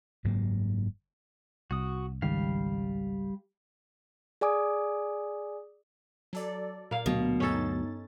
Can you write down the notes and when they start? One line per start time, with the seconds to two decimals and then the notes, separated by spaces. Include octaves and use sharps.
0.24 F#1 G#2 F#3 A#3
1.71 C2 F#4 D#6
2.22 G#1 C#2 D#3 G3 F5
4.41 G#4 D5 G#5 D6 D#6
6.33 F#3 A4 D5
6.91 A#2 A#3 F5
7.06 D2 B2 F#3
7.40 G2 C#4 D#4 A4 A6